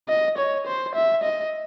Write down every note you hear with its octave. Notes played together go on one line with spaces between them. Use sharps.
D#5
C#5
C5
E5
D#5